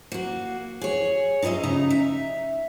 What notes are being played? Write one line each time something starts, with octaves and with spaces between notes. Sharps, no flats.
A#3 F#4
G#4 C#5
D#4 F4 A#4 D#5 E5
C#3 D#4 D#5 A#5
E5